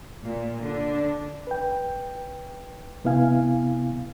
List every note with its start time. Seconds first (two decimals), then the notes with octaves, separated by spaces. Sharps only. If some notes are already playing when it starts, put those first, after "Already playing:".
0.22 A#2
0.59 D3 D4
1.47 B4 G5
3.05 C3 B3 E4 F5 G#5